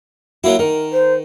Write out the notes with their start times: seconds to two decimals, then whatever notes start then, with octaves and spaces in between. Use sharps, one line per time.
0.44 F#3 A#3 E4 F#4
0.59 D#3 A#4
0.93 C5